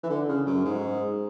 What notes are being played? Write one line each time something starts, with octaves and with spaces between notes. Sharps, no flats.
E3
D3
C#3
F#2
G#2